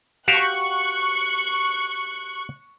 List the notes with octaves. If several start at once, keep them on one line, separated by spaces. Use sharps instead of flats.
F#4 G4 F5 C#6 F#6